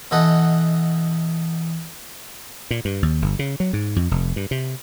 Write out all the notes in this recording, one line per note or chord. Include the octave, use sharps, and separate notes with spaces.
B2 E3 A4 D#5 F#5
A#2
G2
D#2
G1
C#3
F#3
G#2
F2
F1
G2
C3